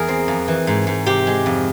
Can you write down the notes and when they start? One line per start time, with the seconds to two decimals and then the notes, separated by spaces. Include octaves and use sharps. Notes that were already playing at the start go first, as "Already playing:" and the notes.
Already playing: E2 G#4 A#4
0.08 C4
0.28 F2
0.48 E3
0.67 G#2
0.87 G#2
1.06 C3 G4
1.27 G#3
1.46 F2